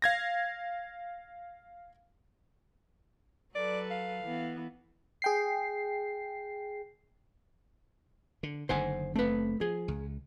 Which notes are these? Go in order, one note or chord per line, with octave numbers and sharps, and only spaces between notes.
F5 G#6 A#6
F#3 A4 B4 D5
F5
E3 B3
G#4 G5 C7
D3
F#1 D3 D#3 C5 F#5 G#5
F#1 A3 C4 B4
F3 G#4
C#2